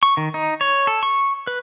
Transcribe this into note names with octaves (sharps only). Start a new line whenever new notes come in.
C#6
D#3
D#4
C#5
A4
C#6
B4